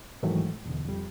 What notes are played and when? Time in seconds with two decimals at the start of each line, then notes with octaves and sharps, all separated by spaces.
0.23 G#2 D#3 E3 F#3 A3
0.66 E2 B2 D3
0.85 F2 G3